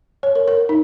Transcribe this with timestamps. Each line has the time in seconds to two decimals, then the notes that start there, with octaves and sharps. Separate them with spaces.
0.23 C#5
0.35 A#4
0.48 A#4
0.69 D#4